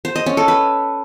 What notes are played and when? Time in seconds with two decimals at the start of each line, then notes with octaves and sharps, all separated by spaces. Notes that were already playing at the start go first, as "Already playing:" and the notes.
0.05 C5
0.16 D#5
0.26 C#4
0.37 A4
0.48 B4